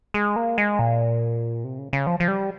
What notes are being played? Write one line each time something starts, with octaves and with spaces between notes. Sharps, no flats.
G#3
A#3
G#3
A#2
C3
C#3
C#3
F3
F3
G3